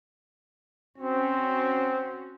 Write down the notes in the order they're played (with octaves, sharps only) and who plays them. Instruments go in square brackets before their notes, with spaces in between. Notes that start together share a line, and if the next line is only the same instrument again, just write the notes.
[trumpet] C4 [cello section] C#4 F#4